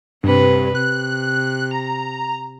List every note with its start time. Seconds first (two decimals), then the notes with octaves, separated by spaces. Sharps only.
0.24 G2 C3 B4
0.75 C3 F#6
1.71 A#5